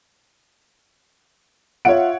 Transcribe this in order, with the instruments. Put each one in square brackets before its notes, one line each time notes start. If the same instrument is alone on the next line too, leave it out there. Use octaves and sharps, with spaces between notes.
[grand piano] F4 E5 D7 [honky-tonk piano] C#5 F#5